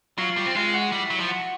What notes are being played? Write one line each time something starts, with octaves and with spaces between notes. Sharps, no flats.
F#3 F4 F5
G3
C4
G#3 F4 F5
F#4 F#5
G3 E4 E5
F#3
F3
F#4 F#5